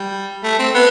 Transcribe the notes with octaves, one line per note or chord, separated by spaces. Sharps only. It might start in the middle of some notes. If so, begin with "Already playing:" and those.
Already playing: G3
A3
C4
B3